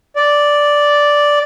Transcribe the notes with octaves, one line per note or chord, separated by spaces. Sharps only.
D5